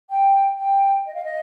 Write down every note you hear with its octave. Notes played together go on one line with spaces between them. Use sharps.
G5
G5
D#5
F5
D#5